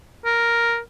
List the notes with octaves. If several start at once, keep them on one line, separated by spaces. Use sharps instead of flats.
A#4